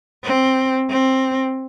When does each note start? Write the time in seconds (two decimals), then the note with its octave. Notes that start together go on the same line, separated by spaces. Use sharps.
0.24 C4
0.90 C4